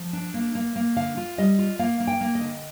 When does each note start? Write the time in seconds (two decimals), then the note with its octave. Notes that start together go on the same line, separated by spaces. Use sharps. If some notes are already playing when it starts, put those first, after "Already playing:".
Already playing: F3
0.13 D4
0.34 A#3
0.55 A#3
0.76 A#3
0.96 D3 F5
1.17 F4
1.38 G3 D#5
1.59 F4
1.79 A#3 F5
2.00 A#3
2.07 G5
2.21 A#3
2.35 D#5
2.42 D3